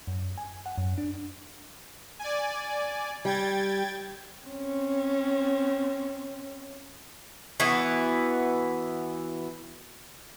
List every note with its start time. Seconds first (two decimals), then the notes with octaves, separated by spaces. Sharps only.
0.07 F#2
0.38 G#5
0.66 F#5
0.78 F#2
0.98 D4
2.19 D5 G#5
3.25 G3 G5 G#6 A6
4.45 C4 C#4
7.60 E3 B3 F#4